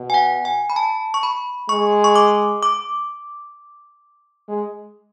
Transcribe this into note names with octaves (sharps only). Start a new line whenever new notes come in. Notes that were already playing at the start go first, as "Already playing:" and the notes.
Already playing: B2
G#5
F#5
G#5
B5
A5
C#6
B5
G#3 C#6
C#6
D6
D6
G#3